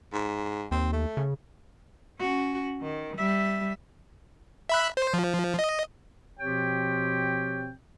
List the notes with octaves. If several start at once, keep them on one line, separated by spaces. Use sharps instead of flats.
G#2
D#2 C4
A3
C#3
C#4 F#4
D#3
G3 E5
E5 B5 F#6
C5
F3
D#5
B2 F3 C4 G4 C#5 G5